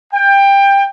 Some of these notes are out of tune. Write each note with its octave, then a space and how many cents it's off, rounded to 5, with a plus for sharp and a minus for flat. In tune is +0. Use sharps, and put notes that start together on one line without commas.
G5 +20